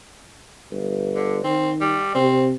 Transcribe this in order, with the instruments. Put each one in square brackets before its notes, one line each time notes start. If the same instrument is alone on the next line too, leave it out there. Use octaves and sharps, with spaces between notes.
[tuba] G1
[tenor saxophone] D3
[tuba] D#3 [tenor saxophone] C4
[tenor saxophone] G3
[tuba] C3 [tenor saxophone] C4